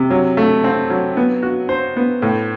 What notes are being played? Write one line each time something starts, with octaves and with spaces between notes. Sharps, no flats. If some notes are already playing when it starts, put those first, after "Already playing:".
Already playing: C3
F#3
A3
C4
F#3
B3
F#4
C5
B3
A2